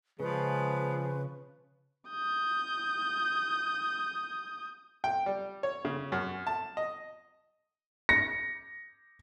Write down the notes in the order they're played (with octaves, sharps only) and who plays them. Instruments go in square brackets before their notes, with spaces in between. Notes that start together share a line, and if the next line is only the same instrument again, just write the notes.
[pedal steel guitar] C#3 [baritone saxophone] F3 [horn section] G#3 G#4 [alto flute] B4
[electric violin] D#6 G6
[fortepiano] G5
G3
C#5
C#3
F#2
A5
D#5
[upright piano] A#6 C#7